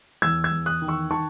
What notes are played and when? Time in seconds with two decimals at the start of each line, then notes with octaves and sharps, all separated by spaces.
0.22 E2 E6 G#6
0.44 E6 G#6
0.51 E2
0.66 D#6 F#6
0.82 D#3
0.88 C#6 E6
1.10 D#3 A5 C#6